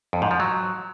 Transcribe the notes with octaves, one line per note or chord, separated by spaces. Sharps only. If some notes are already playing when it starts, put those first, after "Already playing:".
F2
G#2
F3
F#3